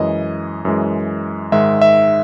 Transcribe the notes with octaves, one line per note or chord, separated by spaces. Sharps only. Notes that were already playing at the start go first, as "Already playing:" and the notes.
Already playing: F#2 E3 G#3 D#5
F#2 E3 G#3
G#2 D#3 G#3 E5
E5